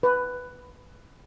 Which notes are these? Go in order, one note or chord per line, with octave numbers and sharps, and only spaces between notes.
B4